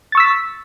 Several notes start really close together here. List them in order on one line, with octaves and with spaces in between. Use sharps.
A6 C#6 E6 B6